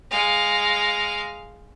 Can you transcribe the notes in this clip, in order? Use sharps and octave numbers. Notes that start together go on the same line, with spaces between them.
G#3 F5